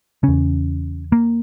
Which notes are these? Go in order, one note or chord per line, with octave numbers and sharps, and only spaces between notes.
E2 C#3 C#4
A#3